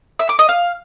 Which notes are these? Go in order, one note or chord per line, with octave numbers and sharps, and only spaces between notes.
E5
D6
D#5
F5